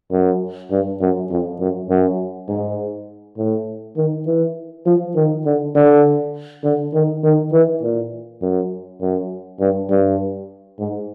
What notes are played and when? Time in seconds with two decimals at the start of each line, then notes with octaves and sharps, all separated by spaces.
0.12 F#2
0.71 G2
1.01 F#2
1.30 F2
1.60 F#2
1.90 F#2
2.49 G#2
3.38 A2
3.97 D#3
4.27 E3
4.86 F3
5.16 D#3
5.46 D3
5.75 D3
6.64 D3
6.94 D#3
7.23 D#3
7.52 E3
7.82 A#2
8.42 F#2
9.01 F#2
9.60 G2
9.90 G2
10.79 G#2